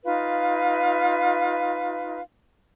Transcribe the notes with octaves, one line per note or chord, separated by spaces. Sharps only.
D#4 F4 B4 F5